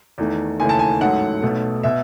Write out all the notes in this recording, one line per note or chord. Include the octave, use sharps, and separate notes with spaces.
E2 D#3 A3
D#2 C#3 E3 A3 G#5
A5
G#5
A1 G#2 F#3 A3 F#5
B1 B2 A3
B2 E5